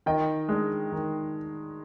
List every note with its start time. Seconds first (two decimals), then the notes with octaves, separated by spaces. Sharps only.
0.06 D#3 D#5 G5
0.49 G#3 D4
0.92 D#3